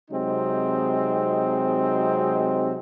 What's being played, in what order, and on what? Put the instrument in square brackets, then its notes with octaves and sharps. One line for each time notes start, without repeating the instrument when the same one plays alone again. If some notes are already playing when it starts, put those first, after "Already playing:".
[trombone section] C3 F#3 G#3 C4 D#4